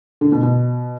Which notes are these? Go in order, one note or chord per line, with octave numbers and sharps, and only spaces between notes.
D3
B2
B2